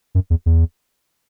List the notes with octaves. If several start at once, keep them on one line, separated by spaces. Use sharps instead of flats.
F#2
E2
E2